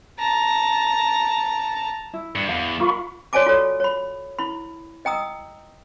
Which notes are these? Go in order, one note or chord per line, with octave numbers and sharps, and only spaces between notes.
A5 A#5
E4
G2
E2 F5
F4 A#4 F5 B5 C#6
F#4 C#5 D5 G#5 A5 D6
F4 F#4 A4 C#5
C#5 B5
E4 B5
D#5 G5 A#5 D#6 E6